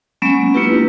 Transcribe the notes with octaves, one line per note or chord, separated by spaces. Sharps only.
F#3 G#3 A#3 B3 C#4
A#3 D4 E4 F4 G4 B4